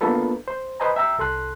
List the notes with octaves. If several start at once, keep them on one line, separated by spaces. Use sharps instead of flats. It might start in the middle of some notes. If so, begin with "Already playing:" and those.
A#3 B3 D4 F4 A4 B4
C5
B4 C5 D#5 G#5 A#5
E5 G5 A#5 E6
C2 A4 C6 F#6